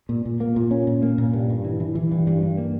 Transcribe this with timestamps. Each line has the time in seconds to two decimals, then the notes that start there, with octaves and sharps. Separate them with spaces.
0.09 A#2
0.25 A#2
0.40 A#3
0.56 A#2
0.71 C#4
0.87 A#2
1.02 A#3
1.18 A#2
1.33 G2
1.50 G2
1.65 E3
1.80 E3
1.95 E3
2.12 G2
2.27 G2
2.42 G2
2.58 A#3